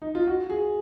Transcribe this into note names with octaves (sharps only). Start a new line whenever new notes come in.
D#4
F4
F#4
G#4